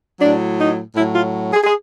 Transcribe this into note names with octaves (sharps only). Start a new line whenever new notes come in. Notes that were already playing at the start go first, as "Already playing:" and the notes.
A2 F#3 D4
D#4
A2 F#3 E4
F4
G#4
G#4